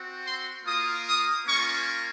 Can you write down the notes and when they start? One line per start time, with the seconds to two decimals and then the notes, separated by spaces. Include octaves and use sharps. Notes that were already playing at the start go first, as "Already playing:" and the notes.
Already playing: C4 F#4
0.26 C6
0.66 A#3 F4 D#6
1.07 D#6
1.46 A#3 C#4 F4 C#6